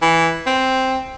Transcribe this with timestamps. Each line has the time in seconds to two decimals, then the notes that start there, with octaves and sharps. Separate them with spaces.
0.02 E3
0.47 C4